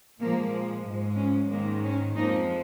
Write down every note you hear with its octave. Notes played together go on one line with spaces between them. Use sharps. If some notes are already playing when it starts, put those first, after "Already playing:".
A#2 F3 G#3 A#3
G#2 F3 G#3
C#4
G#2 D#3 G#3 A#3
C#4
F2 F3 G#3 A#3 D#4